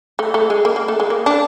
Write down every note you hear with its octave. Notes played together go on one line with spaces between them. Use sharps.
A3
A3
G#3
A#3
A#3
A3
G#3
A#3
D4